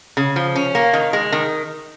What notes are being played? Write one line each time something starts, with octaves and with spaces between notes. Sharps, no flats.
C#3
F3
C#4
A#3
D#3
G#3
D#3